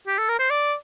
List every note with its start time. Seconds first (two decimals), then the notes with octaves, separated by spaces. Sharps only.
0.07 G4
0.18 A4
0.29 A#4
0.39 C5
0.50 D5